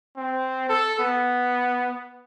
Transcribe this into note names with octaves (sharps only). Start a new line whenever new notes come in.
C4
A4
B3